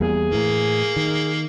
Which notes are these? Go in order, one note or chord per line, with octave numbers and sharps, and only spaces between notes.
E2 G3 A#3 G#4
A2 E3 A#3
D#3